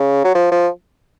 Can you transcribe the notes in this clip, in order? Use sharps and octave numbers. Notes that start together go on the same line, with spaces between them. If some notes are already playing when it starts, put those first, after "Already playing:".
Already playing: C#3
F#3
F3
F3